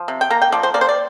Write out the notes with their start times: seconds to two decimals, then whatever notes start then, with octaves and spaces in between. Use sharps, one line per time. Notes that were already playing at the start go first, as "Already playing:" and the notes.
Already playing: F3
0.08 C3
0.21 G5
0.30 A#3 A#5
0.42 G5
0.52 F3 D5
0.63 C5
0.74 A#3 D5
0.81 C5
0.89 D5